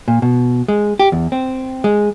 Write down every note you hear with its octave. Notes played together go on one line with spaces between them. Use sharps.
A#2
B2
G#3
G4
E2
C4
G#3